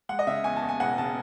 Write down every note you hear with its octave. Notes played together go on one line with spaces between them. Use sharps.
G#3 F#5
D#5
C#3 E5
E2 G#5
A5
E2
G#5
E1 F#5
C#3 A5